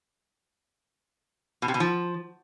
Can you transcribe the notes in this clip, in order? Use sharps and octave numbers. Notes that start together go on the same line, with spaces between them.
B2
C3
B2
F3